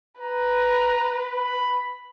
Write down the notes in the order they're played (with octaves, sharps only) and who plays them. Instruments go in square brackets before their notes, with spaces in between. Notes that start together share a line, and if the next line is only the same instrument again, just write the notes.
[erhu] B4 [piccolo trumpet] A#5
[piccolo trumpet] B5